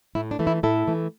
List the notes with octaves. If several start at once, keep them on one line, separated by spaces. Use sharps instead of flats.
A2 E4
D4
E3 A3
E4
A2 E4 A4
E3 A3